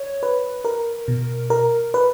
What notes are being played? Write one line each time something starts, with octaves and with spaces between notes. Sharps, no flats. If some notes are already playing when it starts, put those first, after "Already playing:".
Already playing: C#5
B4
A#4
B2
A#4
B4